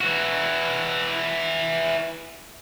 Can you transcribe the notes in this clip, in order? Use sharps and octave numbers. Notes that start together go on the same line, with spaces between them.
E3 F#4